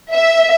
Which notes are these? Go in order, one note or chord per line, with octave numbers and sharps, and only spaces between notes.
E5